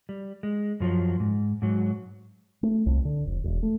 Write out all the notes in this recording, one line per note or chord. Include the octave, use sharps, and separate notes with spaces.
G3
G#3
F#2 F3 F#3
G#2
G#2 F#3
A3
C2
D3
F1
E1
A3